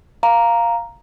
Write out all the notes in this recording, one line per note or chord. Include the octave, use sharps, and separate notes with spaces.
F5 A#5